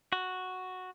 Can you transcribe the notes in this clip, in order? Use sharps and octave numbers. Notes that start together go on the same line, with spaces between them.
F#4